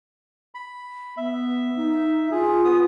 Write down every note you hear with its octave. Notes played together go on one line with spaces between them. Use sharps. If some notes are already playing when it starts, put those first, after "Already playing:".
B5
B3 E5
D#4
F4 G#4
B3 D#6